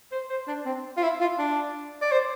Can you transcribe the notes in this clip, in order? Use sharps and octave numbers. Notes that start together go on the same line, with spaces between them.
C5
C5
D4
C4
F4
E4
F4
D4
D5
C5